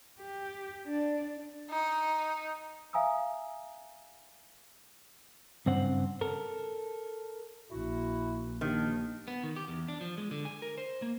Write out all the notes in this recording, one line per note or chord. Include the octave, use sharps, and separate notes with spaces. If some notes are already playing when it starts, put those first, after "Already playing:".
G4
D4
D#4
E5 F5 G#5 A#5 D#6 E6
G2 C#3 C4 C5 F#5
A4 A#4
A#1 E4 F#4
D#3 F3 A#3 D4 G4
B3
D#3
G4
E2
D4
F3
G#3
D3
G#5
A#4
C5
A#3